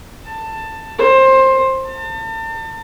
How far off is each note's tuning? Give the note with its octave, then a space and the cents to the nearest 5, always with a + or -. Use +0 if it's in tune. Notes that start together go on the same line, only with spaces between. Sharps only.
A5 +15
C5 +20
A5 +40